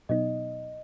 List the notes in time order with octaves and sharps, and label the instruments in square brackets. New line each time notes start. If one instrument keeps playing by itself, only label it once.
[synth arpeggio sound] B2 F#3 B3 D#4 [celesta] D#5